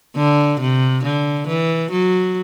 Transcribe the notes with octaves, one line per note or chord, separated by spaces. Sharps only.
D3
C3
D3
E3
F#3